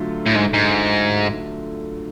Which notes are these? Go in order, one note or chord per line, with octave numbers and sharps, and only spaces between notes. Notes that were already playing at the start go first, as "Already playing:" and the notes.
Already playing: D3 F#3 A3 F4
A2
G#2
G#2